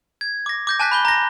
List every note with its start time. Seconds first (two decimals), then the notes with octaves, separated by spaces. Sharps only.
0.21 G#6
0.46 D6 A#6
0.67 D6 G6 A#6
0.80 G#5 A5 F#6 G6 B6
0.91 B5 G6 G7
1.05 A#5 A#6